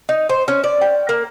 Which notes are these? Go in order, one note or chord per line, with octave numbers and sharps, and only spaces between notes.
D#4
C5
C#4
D5
G5
A#3